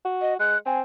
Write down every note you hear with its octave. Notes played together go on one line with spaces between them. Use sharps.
F#4
D#5
G#3 F#6
C4 G#5